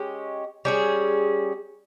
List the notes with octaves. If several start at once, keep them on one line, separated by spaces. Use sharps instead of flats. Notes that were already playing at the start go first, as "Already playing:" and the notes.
Already playing: G#3 C#4 G4
G3 C#4 G#4